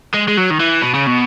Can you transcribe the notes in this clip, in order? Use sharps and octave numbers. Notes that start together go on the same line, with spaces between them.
G#3
G#3
F#3
D#3
E3
B2
C#3
B2